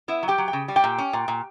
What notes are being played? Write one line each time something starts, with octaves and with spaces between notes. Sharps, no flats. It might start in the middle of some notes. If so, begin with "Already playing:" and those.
B3 E4 E5
F#3
G4 G5
F#3
G5
C#3
G3
G4 G5
A#2
C#4
A#2
A#2